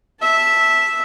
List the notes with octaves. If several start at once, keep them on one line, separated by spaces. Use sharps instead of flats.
E5 A5